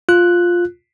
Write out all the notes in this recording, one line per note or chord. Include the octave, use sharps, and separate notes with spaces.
F4 F#6